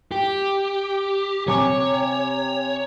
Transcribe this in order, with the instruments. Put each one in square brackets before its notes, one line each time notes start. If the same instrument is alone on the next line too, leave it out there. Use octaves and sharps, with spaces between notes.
[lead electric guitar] G4
[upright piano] C3 G#5 D6 [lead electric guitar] C#5